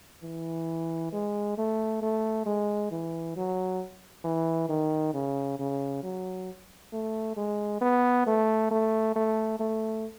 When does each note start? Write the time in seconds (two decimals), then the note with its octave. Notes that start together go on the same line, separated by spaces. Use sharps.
0.23 E3
1.13 G#3
1.58 A3
2.02 A3
2.46 G#3
2.92 E3
3.37 F#3
4.25 E3
4.69 D#3
5.14 C#3
5.59 C#3
6.04 F#3
6.93 A3
7.37 G#3
7.81 B3
8.27 A3
8.71 A3
9.16 A3
9.60 A3